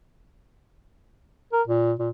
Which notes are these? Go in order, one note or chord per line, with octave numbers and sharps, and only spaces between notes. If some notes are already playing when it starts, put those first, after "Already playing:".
A#4
A#2
A#2